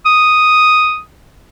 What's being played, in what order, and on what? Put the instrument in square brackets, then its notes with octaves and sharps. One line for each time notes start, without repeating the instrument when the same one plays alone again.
[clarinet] D#6